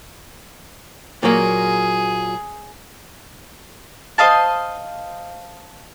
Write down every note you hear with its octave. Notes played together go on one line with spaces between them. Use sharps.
A#2 F#3 A#3 G#4
C5 D#5 F5 A5